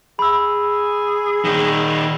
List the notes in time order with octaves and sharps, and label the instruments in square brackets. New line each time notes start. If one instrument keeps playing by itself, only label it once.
[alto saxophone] G#4 [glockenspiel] B5 E6
[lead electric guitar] A#2 D#3